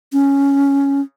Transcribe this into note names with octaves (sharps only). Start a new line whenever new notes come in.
C#4